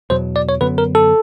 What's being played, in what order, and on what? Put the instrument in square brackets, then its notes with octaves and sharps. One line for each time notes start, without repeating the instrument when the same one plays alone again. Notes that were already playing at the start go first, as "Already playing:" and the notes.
[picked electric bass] E2 B2 F#3 [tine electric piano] C5
[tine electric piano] D5
C#5
[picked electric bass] F#2 D3 F#3 B3 [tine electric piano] B4
[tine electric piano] A#4
A4